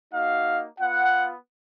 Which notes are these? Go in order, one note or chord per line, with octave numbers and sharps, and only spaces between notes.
A#3 D#4 F#4 F5
B3 F4 F#5